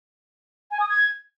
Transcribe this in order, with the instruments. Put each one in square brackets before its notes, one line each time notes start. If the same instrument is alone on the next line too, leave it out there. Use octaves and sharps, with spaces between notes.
[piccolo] G#5
D#6
G#6